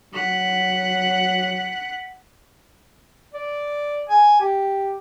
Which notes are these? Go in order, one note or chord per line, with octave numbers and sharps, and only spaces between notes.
F#3 F#5 B6
D5
G#5
G4